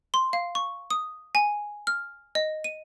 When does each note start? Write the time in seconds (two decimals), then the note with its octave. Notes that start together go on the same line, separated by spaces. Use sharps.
0.14 C6
0.33 F5
0.55 C#6
0.91 D#6
1.35 G#5
1.87 F6
2.35 D#5
2.64 D#7